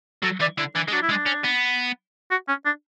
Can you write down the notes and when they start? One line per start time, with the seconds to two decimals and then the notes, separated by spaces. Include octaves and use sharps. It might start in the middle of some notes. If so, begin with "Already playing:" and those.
0.23 F#3 A4
0.40 E3 D5
0.58 D3 E4
0.75 E3 D4
0.88 G#3
0.92 F#3 D4
1.02 E4
1.09 G#3 D4
1.26 C#4
1.44 B3
2.31 F#4
2.48 C#4
2.66 D4